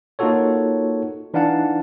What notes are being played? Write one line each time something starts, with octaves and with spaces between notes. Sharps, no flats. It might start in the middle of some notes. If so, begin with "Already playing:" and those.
A#3 D#4 F4 F#4 A4 C#5
E3 D4 D#4 F5 F#5 A5